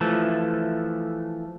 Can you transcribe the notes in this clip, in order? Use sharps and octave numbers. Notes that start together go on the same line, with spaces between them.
E3 F3 A3